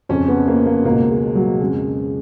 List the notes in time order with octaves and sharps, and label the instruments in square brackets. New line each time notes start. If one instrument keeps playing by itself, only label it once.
[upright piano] F2 C#3 C#4
B3
A#3
A#3
C#2 B2 A#3
G#3
F#3
F2 C#3 G#3